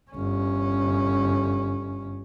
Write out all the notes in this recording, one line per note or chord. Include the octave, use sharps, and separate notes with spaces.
G1 C#4